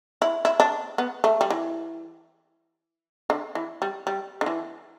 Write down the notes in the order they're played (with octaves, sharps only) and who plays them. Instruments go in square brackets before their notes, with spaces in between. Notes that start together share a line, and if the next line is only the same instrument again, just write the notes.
[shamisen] E4
E4
D4
B3
A3
G3
E3
D3
E3
G3
G3
D3
E3